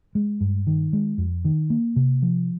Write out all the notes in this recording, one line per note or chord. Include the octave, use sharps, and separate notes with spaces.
G#3
G2
D#3
G#3
F2
D#3
A#3
C3
F3